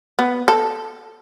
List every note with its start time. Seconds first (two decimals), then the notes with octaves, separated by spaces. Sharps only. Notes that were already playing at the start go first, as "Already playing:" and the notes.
0.19 B3
0.48 A4